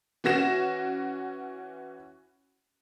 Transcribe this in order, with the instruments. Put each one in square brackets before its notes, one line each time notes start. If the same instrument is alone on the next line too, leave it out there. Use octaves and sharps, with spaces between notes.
[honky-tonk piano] E3 C#4 F#4 A#6 E7